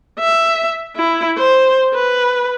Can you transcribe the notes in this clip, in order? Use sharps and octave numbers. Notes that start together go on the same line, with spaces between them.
E5
E4
C5
B4